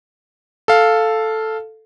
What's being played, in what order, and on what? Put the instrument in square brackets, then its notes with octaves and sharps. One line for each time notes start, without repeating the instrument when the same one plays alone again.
[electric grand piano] A4 F5